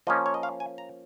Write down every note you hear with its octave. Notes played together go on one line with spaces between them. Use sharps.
F3 A#3 C#4 D#5
C#5
D#5
F5
G#5
A#5